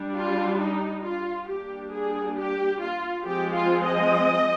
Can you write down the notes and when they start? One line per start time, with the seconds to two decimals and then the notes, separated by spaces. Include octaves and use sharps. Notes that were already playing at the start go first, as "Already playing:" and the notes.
Already playing: G3 D4
0.15 F4
0.59 D#4
1.04 F4
1.48 G3 A#3 D4 G4
1.92 G#4
2.37 G4
2.80 F4
3.24 F3 G#3 C4 G4
3.54 F4
3.84 D#5